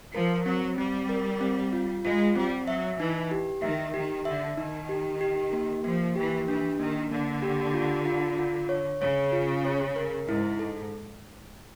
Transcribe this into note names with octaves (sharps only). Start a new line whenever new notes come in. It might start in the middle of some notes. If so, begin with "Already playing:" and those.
F3 A#4
F#3 C4
G3 C4
A#4
C4
F4
G#3 F4
G3 C4
F#3 E5
E3 D#4
G4
D#3 E5
D#3 G4
D3 E5
D#3 D#4
G4
G4
A#3
F3 A#3
E3 G4
E3 D4
D#3 A#3
D3 A#3
G4
F4
F4
F4
C#5
C#3 C#5
F4
C#5
A#4
G#2 E4
A4